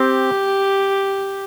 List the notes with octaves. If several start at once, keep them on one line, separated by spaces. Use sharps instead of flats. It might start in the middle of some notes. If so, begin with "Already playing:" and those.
Already playing: C4 G4